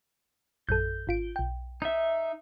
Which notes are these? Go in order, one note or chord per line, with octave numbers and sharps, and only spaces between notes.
A#1 F#2 A4 G6
G#1 F4 D7
B1 G5
D#4 E5